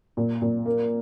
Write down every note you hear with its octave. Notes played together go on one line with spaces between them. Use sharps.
A#2
A#2
A#3